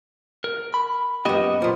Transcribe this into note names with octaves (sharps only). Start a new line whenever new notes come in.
A#4
B5
F#2 A#3 B3 G4 D#5
A#2 F3